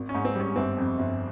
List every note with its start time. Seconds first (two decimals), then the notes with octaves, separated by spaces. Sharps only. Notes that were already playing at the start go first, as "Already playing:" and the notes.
Already playing: G#1
0.09 C#4
0.15 G#2
0.25 C4
0.35 G3 C#4
0.56 G1 C4
0.77 F2
0.99 G1